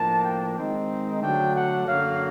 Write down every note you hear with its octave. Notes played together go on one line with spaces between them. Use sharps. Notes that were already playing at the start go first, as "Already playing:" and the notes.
Already playing: A2 F3 A#3 D4 A5
G5
D#3 G#3 C4 D#4
D3 F#3 A3 D4 G5
F#5
F#2 D3 F#3 A#3 F5